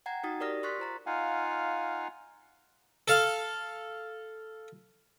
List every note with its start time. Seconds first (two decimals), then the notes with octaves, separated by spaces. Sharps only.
0.06 F#5 G5 A#5 G#6 C7
0.23 D#4 F#4 D#6 A6
0.40 G4 A#4 D5 D#6 F6 A#6
0.63 C6 C#6 F6 F#6 A6 B6
0.78 F4 C5 A#5 A6
1.06 D#4 F4 F5 F#5 G#5
3.08 A4 F5